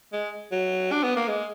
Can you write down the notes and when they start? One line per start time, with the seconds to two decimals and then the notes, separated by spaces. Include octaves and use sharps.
0.12 G#3
0.51 F#3
0.92 D4
1.03 B3
1.16 A#3
1.28 G#3